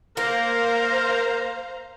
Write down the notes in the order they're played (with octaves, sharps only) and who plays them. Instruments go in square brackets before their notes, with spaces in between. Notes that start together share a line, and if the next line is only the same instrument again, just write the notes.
[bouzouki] A#3 [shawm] A#4 [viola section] C5 F5 A#5